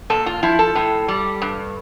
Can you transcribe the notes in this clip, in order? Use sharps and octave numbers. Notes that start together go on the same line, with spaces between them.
A#2 A4
F4
F3 E4
A4
A2
G3
G2